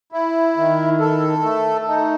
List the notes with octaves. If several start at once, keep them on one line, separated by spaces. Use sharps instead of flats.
E4
D#3
A4
A3
D#4